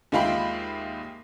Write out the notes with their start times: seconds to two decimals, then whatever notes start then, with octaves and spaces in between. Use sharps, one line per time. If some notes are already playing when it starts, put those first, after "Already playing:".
0.12 D#2 G#3 F4 E5 G5 B5